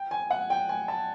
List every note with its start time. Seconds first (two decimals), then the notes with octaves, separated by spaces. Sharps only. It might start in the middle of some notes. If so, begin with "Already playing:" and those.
Already playing: G5
0.11 G#5
0.31 F#5
0.50 G5
0.69 G#5
0.88 A5